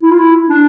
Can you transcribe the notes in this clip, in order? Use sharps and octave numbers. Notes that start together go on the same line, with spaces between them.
E4
F4
E4
D4